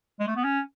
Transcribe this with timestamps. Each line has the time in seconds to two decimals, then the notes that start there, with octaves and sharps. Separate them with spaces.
0.20 G#3
0.28 A3
0.37 B3
0.44 C#4